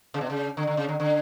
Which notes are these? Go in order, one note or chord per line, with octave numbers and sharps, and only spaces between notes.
C#3
B2
C#3
D3
D3
C#3
D3
D3